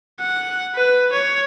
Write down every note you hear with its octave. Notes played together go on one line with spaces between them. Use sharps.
F#5
B4
C#5